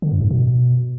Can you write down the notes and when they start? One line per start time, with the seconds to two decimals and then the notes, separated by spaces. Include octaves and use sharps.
0.02 D3
0.12 F#2
0.21 G#2
0.31 B2